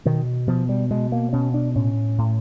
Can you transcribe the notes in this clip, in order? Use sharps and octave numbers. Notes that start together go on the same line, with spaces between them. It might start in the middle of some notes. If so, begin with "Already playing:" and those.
B2 D#3
B2 F3
G3
B2 G#3
A#3
B2 C#4
D4
A2 C#4
A2